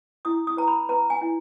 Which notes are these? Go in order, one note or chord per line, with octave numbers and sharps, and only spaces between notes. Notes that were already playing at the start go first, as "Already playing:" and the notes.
E4 D#6
D#6
B4 A#5
B5
B4 A#5
G#5
E4